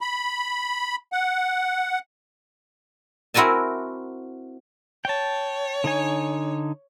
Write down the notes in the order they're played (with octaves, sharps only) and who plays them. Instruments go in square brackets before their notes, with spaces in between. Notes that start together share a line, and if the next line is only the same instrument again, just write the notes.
[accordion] B5
F#5
[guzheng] C4 E4 F#4 A#4 G#5 A5
[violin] C#5 [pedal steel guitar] G5 A5
[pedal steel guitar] D3 D#4 G#5